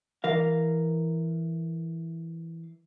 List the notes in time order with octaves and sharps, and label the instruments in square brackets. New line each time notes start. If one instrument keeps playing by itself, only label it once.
[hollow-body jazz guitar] E3 A#4 F5